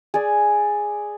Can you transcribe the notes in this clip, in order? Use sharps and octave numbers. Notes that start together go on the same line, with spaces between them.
G#4 D5